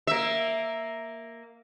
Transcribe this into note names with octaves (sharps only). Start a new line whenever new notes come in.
A#3 E5